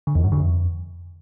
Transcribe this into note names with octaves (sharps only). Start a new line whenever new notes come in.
D3
E2
G2
D3
F2